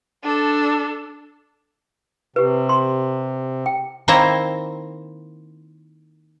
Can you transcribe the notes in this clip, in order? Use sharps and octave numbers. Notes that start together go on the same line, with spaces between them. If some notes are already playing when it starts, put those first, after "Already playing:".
D4 A4
C3 G4 B4
C6
G5
D#3 A#3 C4 E4 C5 A#5